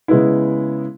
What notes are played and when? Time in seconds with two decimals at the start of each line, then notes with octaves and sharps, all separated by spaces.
0.08 C#3 G#3 B3 E4